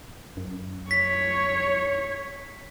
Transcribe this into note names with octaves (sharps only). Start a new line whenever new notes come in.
F#2
C#5 B6